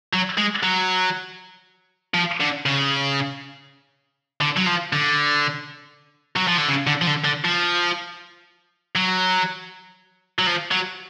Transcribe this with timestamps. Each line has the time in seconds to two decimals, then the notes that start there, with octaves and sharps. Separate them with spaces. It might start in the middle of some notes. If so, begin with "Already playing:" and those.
0.13 F#3
0.38 G#3
0.63 F#3
2.14 F3
2.41 D3
2.66 C#3
4.41 D3
4.57 F#3
4.67 F3
4.93 D3
6.36 F#3
6.47 F3
6.58 D3
6.68 C#3
6.87 D3
7.01 F3
7.07 D3
7.25 D3
7.45 F3
8.96 F#3
10.39 F#3
10.47 F3
10.71 F#3